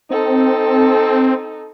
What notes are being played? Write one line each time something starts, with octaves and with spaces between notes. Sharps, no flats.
C4 D#4 A4